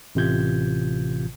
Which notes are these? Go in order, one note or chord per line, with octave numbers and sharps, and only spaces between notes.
A1 C3 F4 G6 G#6